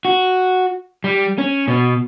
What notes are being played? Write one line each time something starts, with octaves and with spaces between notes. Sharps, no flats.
F#4
G3
C#4
B2